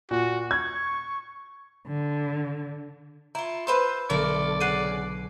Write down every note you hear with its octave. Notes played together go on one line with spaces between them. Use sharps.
A#2 F#4
C#6 G#6
D3
E4 F4 A#5
B4 C5 A5 B5 C6 E6
B1 D3 A3 A#4 D5
C#3 F#5 F#6 C7 D#7
G#5